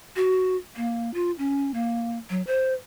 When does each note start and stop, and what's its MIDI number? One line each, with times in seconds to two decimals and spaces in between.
0.16 0.56 66
0.76 1.13 58
1.14 1.32 65
1.38 1.73 61
1.74 2.18 58
2.30 2.42 54
2.47 2.74 72